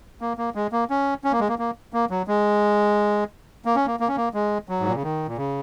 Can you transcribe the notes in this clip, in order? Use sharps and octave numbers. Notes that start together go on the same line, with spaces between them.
A#3
A#3
G#3
A#3
C#4
C#4
A#3
G#3
A#3
A#3
A#3
F#3
G#3
A#3
C#4
A#3
A#3
C#4
A#3
G#3
F#3
G#2
A#2
C#3
D#3
A#2
C#3